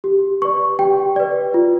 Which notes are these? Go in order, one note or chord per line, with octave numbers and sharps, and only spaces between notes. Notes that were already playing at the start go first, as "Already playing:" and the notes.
G4
B4 D5 C#6
G4 G5
B4 D5
F4